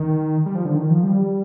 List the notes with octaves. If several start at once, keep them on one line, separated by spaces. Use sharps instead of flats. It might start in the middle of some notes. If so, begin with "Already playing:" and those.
Already playing: D#3
G3
F3
D3
D#3
F3
G3